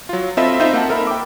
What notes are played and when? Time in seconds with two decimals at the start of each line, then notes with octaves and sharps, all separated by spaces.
0.09 F#3 F4
0.37 C4 F4 A4 D#5 E5 B5
0.59 C4 D#4 F4 C5 D#5 E5
0.73 A#3 F#5 A5
0.89 A4 A#4 E5 B5
1.07 G5 D6